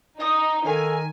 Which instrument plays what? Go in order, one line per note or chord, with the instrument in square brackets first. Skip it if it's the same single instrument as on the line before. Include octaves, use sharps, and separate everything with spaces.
[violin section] D#4 [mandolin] D#5 G5 D#6
[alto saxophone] D#3 [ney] A4 [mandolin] F5 [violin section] G#5